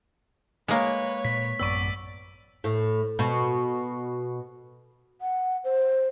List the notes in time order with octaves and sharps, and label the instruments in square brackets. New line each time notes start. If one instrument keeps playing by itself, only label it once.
[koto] G#3 A#3 [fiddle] B4 C#5
[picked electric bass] A#2 [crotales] B6
[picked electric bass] A1 F#2 B3 [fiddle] D5 [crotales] C#6 E6
[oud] A2
B2
[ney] F#5
C5